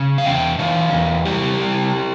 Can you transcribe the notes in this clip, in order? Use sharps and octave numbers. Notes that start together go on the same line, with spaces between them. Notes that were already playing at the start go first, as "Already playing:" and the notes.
Already playing: C#3
F5
E2 E5 G5
E3 C#5 F5
E2
G3 E4 G4
G3